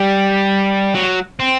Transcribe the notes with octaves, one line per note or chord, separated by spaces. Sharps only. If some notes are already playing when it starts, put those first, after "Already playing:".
Already playing: G3
F#3
C4